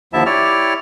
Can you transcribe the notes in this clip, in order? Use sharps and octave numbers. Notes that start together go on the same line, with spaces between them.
D#2 D3 F3 E4 E5 A5
E4 G4 C#5 D5 F6